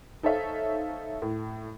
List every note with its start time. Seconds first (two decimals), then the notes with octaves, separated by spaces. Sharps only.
0.23 D#4 A4 C5 C#5 E5 F5
1.22 A2